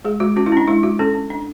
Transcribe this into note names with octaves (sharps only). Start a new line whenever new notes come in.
G#3 G#4
G#3 F#4
C#4 F#4
E4
C#4 D4
G#3 E4
G#3 F#4
C#4 A4
C#4
D4